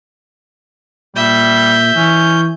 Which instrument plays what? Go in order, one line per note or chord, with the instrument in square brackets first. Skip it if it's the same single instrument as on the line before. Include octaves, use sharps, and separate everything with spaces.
[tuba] A#2 [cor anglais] G3 [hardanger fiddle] E5 [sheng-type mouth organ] G6
[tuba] E3 [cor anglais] C#4